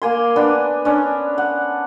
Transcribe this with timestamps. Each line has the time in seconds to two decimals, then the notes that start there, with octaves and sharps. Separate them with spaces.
0.02 A#3 G#5 C6
0.36 B3 D4
0.85 C#4 D4
1.38 F#5